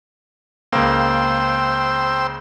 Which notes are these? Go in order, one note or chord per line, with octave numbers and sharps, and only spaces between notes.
C#2 A#3 C5 G5 E6